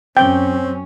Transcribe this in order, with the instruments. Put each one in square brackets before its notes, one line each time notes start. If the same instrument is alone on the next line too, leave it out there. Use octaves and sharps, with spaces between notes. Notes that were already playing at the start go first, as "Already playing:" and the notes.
[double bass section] F#2 C#4 [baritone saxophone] C4 [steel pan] G5